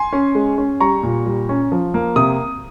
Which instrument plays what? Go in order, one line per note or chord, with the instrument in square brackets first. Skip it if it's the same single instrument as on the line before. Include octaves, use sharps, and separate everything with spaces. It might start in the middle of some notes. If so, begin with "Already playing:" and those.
Already playing: [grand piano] G#5 C6
C#4
G#3
C#4
G3 A#5 C#6
A#2
G3
C#4
F3
A#3
C3 D#6